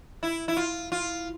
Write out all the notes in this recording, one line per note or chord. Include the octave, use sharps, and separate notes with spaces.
E4
E4
F4
F4